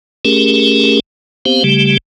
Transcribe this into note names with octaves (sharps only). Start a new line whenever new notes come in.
A3 C#4 G4 G#4 A#4
B3 C4 G4 C5 F5
C#3 G3 A3 G4